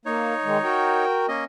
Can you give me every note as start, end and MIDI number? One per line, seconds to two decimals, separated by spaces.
0.05 0.34 58
0.05 1.05 63
0.05 1.05 73
0.44 0.58 51
0.44 0.58 56
0.63 1.26 66
0.63 1.26 70
0.63 1.26 79
1.28 1.44 58
1.28 1.44 61
1.28 1.44 75